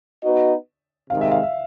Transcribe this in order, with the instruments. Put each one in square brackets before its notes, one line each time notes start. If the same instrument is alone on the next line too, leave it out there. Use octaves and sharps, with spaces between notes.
[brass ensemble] B3 D#4 F#4 B4 D#5
[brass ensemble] C3 D#3 G#3 [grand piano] F5
[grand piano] E5
F5
E5